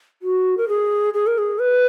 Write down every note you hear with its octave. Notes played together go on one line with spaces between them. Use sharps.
F#4
A#4
G#4
G#4
A#4
G#4
B4